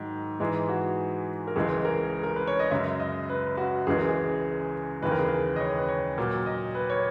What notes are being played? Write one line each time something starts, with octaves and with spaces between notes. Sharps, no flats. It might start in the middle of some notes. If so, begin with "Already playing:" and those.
Already playing: G#2 D#3 F#3
G#2 E3 G#3 G#4
F#4
A#4
C#2 C#3 E3 G#3 G#4
A#4
A#4
B4
C#5
D#5
F#2 C#3 G#3 E5
D#5
B4
F#4
C#2 C#3 E3 G#3 G#4
A#4
G#4
D#2 C#3 E3 G#3 B4
A#4
G#4
A#4
D#5
C#5
B4
C#5
A#2 F#3 A#4
D#5
B4
C#5